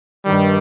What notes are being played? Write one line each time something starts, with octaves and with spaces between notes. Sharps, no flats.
G2 D#3 G3